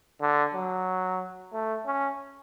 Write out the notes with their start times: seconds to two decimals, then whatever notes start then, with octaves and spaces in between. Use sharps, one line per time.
0.21 D3
0.54 F#3
1.53 A3
1.86 C#4